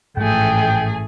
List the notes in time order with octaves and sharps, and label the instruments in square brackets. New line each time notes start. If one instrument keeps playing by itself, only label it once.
[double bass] A1 [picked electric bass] G#2 E3 F3 [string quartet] A3 G#4 [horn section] G5